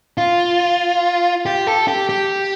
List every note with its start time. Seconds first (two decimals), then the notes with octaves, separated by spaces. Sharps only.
0.18 F4
1.46 G4
1.67 A4
1.88 G4
2.09 G4